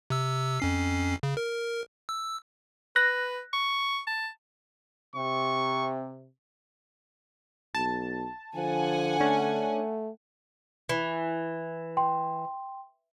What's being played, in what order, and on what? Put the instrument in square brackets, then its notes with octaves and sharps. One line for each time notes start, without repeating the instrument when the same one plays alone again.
[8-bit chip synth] C3 E6
F2 C#4 C7
C#3
A#4
E6
[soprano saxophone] B4 [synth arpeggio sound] F#6 A#6
[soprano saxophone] C#6
A5
[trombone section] C3 [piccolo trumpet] C#6
[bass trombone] B1 [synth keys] A5
[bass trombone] D3 [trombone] F3 [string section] F#5 G#5
[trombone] A3 [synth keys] C#4 D4
[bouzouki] E3
[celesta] G5 C6